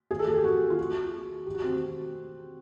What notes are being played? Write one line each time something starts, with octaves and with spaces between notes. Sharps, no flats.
G#4
A4
G#4
G4
F#4
F4
F#4
G4
F#4
C4